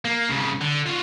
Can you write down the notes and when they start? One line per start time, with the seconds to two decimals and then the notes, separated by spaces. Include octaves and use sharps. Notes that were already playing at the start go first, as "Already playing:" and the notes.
0.05 A#3
0.30 C2 C#3
0.61 D3
0.86 F4 F#4